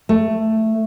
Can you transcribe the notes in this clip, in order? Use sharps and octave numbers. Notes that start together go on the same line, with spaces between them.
A3